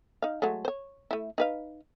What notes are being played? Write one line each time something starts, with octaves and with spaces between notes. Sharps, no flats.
D#4 F5
F#3 G#3 A3
C5 C#5
A3 E4
D#4 B4 F5